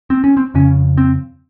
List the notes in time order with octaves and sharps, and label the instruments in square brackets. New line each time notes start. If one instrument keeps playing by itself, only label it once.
[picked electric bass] C4
C#4
C4
F2 C#3 C#4
C4